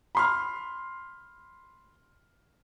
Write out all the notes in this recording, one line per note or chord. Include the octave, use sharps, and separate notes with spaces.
B5 C6 F6